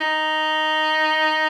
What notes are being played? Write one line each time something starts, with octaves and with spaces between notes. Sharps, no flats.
D#4